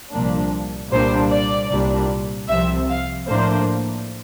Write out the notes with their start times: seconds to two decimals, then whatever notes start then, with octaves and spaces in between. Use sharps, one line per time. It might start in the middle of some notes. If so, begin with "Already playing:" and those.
0.12 C2 A#2 F3 A#3 D4
0.92 C2 A#2 G3 D4 C5
1.31 D5
1.70 C2 A#2 G3 D4
2.49 C2 C3 F3 E5
2.89 F5
3.28 A2 F3 A#3 D4 C5